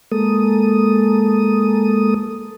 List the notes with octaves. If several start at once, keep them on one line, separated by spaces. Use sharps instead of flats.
G#3 A#3 A4 D#6